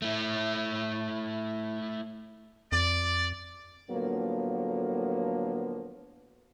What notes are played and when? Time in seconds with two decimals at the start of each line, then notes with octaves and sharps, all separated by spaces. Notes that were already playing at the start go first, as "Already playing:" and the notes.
0.02 A3 E4
2.72 F2 D5
3.91 A2 D3 F3 F#3 A#3 B3